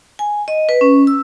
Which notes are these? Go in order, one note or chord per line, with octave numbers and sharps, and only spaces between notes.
G#5
D#5
B4
C#4
E6